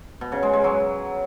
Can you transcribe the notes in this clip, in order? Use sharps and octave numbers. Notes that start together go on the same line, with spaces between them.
B2
C#3
G#3
G#3
F#3